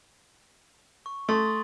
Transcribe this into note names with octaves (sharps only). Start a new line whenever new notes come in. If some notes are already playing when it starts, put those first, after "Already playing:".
C#6
A3 C6 D#6 A6